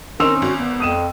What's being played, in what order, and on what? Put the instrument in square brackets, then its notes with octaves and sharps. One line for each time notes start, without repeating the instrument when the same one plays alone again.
[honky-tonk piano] D#3 C4 D#4 [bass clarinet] C#4 [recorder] A#4 [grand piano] C6 E6 F7
[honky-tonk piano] G#1 [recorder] F#4
[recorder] B3
[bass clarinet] F2 [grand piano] D#6 D#7 E7